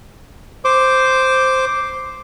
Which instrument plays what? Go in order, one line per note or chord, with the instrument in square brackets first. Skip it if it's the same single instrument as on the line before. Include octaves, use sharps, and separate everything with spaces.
[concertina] C5 D6